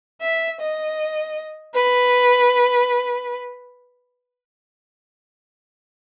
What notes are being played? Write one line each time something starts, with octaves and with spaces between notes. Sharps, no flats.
E5
D#5
B4